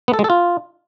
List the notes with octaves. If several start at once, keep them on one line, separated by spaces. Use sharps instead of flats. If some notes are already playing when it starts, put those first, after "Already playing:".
B3
A4
G#3
A4
F4